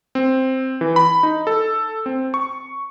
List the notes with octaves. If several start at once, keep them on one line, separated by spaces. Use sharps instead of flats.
C4
E3
B5
D#4
A4
C4
C#6